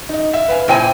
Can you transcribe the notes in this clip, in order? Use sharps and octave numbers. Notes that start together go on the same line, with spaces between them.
D#4 D#5
E5 F5
B4 F5 G#5
A#2 E4 C5 G5 G#5